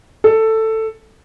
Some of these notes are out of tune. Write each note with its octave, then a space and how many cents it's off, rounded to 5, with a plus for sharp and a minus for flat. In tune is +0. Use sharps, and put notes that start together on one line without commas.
A4 +10